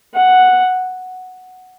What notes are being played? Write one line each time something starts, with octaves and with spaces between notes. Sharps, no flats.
F#5